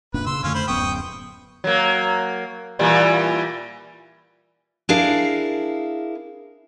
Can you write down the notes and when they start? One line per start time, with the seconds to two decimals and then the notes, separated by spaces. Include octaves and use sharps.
0.14 F#1 A#2 D4 B4
0.27 C#3 C6 E6
0.43 F2 D3 A3 C#4 F4
0.55 C5 B5
0.68 D1 F#2 B3 G5 C#6 D#6
1.64 F#3 A#3
2.79 A#2 E3 G3
4.89 D4 E4 G#4 A#4 F5